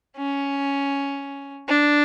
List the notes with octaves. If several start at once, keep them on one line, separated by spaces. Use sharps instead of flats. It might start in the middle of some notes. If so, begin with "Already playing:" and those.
C#4
D4